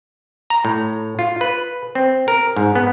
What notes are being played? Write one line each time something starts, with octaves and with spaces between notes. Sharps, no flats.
A#5
A2
F4
B4
C4
A#4
G#2
B3